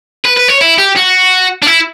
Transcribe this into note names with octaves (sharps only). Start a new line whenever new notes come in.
B4
B4
C#5
E4
G4
F#4
D4
E4